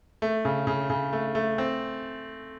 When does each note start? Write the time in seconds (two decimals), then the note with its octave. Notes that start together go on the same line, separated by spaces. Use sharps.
0.22 A3
0.45 C#3
0.67 C#3
0.90 C#3
1.13 A3
1.35 A3
1.58 C4